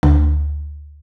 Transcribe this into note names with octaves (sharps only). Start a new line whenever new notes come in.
D2